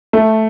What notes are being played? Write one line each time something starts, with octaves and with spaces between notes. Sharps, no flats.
A3